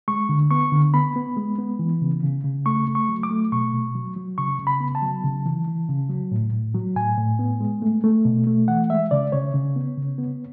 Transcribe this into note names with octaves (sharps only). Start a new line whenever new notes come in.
G#3 C#6
D3
B3 C#6
D3
B3 B5
B3
G#3
B3
E3
C#3
C#3
C#3
A3 C#6
A3
C#6
F#3
D6
A3
B2 C#6
B2
F#3
F#3
C#3 C#6
C#3
B5
B3
A5
F#3
C#3
E3
E3
C#3
F#3
A2
A2
F#3
A2 G#5
A2
B3
G#3
A3
A3
B2
A3
E3 F#5
G#3 E5
C#3 D5
C#3 C#5
C#3
B3
C#3
B3